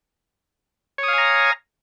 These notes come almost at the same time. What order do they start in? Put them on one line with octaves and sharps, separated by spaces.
C#5 D#6 F5 G#5 A#5